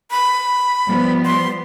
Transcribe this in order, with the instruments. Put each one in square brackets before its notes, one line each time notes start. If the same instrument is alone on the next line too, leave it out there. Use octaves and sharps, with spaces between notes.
[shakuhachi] B5
[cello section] F3 G3 B3
[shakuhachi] C6